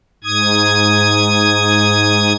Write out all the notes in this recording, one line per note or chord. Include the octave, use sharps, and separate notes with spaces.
G#2 D#6 G#6